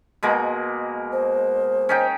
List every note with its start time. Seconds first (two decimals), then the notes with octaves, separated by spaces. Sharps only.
0.23 B2 G#3 A#3
1.12 C5
1.89 C#4 D#4 G5